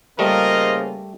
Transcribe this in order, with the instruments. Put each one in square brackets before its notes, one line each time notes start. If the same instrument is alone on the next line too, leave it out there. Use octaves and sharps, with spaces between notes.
[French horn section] C#3 A#3 [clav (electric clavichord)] G3 A3 [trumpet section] F4 A#4 D#5 [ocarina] C5